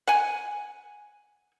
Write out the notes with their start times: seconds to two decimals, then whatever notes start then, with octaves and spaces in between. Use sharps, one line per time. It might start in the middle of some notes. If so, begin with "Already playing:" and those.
0.07 F#5 G#5